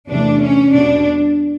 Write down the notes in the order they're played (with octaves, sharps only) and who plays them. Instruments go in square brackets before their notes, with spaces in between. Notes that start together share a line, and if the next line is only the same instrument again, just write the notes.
[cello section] E2 C3 E3 A3 D4
C#4
E2 B2 G3 D4